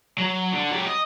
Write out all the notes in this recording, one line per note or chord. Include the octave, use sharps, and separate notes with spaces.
F#3
D3
F#3 G4
D#5